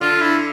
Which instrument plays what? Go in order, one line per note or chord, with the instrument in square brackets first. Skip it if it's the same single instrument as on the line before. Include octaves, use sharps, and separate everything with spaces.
[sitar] D3 [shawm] F4
[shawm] E4